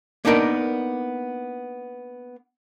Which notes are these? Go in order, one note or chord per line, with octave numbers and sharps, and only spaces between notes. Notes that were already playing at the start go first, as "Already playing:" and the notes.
A#3 B3 D4 D#4 A#4 D5